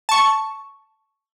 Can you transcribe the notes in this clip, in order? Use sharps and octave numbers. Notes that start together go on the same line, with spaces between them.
A5 C#6